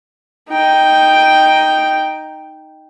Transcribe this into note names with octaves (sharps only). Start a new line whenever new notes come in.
D#4 G5